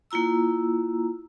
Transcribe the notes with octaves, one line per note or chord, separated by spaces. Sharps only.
A#3 E4 F4 A#5 E6